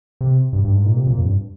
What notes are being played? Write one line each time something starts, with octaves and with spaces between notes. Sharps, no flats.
C3
G2
G2
G#2
A#2
C3
A#2
F2
G2